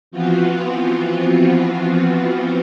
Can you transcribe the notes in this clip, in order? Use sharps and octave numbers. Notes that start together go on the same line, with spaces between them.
E3 F3 B3 C4 F4 F#4